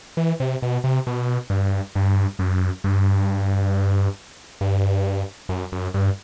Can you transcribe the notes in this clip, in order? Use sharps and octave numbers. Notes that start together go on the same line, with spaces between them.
E3
C3
B2
C3
B2
G2
G2
F#2
G2
G2
F#2
F#2
G2